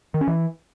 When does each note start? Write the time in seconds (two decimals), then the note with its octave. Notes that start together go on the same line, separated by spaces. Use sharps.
0.14 D#3
0.21 C#4
0.27 E3